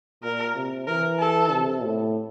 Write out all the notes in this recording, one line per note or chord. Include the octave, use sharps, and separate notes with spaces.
A#2 A#4
C3
E3 A#4
A4
C3
A2